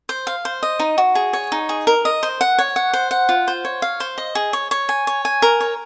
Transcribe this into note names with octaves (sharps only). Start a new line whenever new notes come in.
C5
F5
C5
D#5
D#4
F#4
G#4
C#5
D#4
G#4
A#4
D#5
C5
F#5
C#5
F#5
C5
F#5
F4
C5
C#5
F5
C5
D#5
G#4
C#5
C#5
G#5
C#5
G#5
A#4
C#5